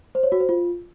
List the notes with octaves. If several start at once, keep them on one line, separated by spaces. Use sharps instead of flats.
C5
C#5
F#4
C5
F4